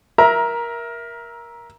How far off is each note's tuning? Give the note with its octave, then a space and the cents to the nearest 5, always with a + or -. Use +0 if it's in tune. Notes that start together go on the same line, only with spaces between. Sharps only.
A#4 +15 E5 +0 A#5 +25